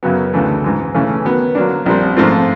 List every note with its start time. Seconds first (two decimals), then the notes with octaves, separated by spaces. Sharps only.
0.03 F#2 C#3 F#3 B3
0.34 D2 C#3 E3 A3
0.64 G#2 E3 G#3
0.94 C#3 E3 A3 C#4
1.25 D#3 F#3 B3
1.55 D3 F#3 A#3 D4
1.86 A#1 A#2 G3 C4
2.16 G#2 F3 A3 C4 F4